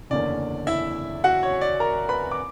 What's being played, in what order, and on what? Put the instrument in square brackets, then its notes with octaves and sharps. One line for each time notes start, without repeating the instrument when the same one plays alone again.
[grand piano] F#1 E2 D3 A#3 C#4 D5
E4 E5
F#4 F#5
C#5
D5
A#4 A#5
B4 B5
D6